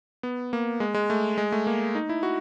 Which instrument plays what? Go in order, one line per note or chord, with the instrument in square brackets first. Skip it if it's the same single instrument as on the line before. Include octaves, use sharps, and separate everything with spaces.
[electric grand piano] B3
A#3
G#3
G#3
A3
G#3
A3
A#3
D#4
E4
F#4